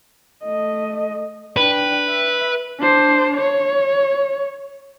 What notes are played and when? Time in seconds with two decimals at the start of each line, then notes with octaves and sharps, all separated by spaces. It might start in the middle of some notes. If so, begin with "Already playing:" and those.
0.44 A3 D#5
1.57 D4 B4 G5
2.08 E5
2.80 D4 C5
3.38 C#5